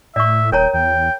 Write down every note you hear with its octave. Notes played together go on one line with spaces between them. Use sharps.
A2 D5 E5 C#6
D#1 A#4 C#5 G5 A#5
E2 G5